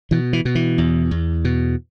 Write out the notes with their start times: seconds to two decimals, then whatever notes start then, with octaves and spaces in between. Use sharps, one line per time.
0.11 B2 E3
0.33 E3
0.45 B2
0.55 E3
0.78 E2
1.11 E2
1.45 B2